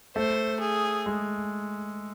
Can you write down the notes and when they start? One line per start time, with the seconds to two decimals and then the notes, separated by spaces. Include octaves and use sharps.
0.16 A3 C5
0.60 G#4
1.06 G#3